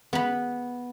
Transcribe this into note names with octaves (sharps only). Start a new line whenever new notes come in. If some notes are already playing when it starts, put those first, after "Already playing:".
B3 B5